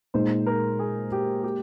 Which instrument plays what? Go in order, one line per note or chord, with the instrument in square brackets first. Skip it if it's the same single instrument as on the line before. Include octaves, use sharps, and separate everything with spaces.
[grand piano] A#2 G#3 D#4 [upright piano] C5
[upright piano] A#4
G#4
G4
G4